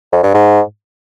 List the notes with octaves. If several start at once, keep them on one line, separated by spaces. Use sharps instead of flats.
F2
G2
G#2